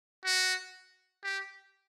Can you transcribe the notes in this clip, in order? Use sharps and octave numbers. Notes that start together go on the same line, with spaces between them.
F#4
G4